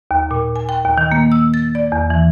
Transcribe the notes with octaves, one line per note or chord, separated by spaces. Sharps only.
D#2
A#2
G#5
G5
D#2
D#3
A#3
E6
A6
D5
E2
E3